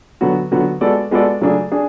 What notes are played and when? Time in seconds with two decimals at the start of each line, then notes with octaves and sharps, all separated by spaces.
0.21 D3 F#3 B3 F#4
0.51 D3 F#3 B3 F#4
0.81 G#3 B3 F#4 A4 D5
1.11 G#3 B3 F#4 A4 D5
1.41 C#3 F#3 A3 D4 G#4
1.72 D4 G#4